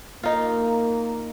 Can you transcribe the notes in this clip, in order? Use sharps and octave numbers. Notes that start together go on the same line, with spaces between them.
A#3 D#4 F4